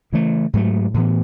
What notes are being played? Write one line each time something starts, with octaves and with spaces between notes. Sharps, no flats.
C#3 E3 A3
G#2 F#3 A3
A2 E3 B3